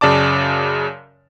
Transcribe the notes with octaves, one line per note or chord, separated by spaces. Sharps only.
F#2 C#3 D5 A5 D6